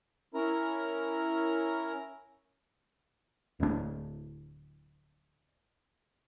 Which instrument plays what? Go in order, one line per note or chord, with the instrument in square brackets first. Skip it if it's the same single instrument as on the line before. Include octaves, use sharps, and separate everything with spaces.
[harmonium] C#4 E4 A#4 A#5
[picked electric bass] D1 D2 G#3 D4